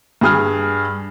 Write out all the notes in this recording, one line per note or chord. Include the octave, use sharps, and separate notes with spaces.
G2 G#4 F6